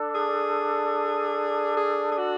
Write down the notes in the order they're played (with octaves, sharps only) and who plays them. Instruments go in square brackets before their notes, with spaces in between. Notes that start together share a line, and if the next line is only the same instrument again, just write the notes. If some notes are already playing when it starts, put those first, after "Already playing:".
Already playing: [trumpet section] D4 A4 D5
[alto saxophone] G#4
G#4
G#4
F#4